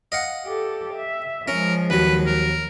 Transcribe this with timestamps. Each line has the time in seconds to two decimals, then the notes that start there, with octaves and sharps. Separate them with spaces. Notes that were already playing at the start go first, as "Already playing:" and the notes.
0.12 D#5 F5 F#5
0.46 G4 A4
0.95 E5
1.48 F3 G#3 C#4 A#4
1.90 D#2 F#3 B4
2.26 A#4